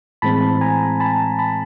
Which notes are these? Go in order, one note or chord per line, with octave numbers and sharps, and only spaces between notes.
A2 E3 G#3 C4 A5 B5
G#5 A#5
A5 B5
A5 B5